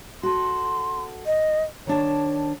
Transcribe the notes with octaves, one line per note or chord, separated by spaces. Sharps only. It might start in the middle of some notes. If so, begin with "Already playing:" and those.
F#4 A4 C6
D#5
D#3 D4 C#5 A5